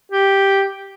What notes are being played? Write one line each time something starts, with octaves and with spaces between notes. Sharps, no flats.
G4